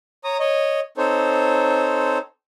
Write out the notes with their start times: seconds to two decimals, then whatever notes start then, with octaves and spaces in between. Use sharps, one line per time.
0.24 C#5 A#5 D#6
0.39 C#5 D#5
0.98 C4 D#4 A4 C5 C#5